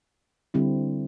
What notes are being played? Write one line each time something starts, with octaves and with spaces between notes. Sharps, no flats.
D3 G3 C4 E4